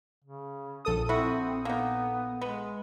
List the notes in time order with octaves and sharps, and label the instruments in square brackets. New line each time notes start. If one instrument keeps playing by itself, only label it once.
[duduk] C#3
[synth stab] A#1 A4 D#6
[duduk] C4 [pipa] E4 F#4
[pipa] A#3 D#4 [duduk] B3
[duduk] G#3 [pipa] B3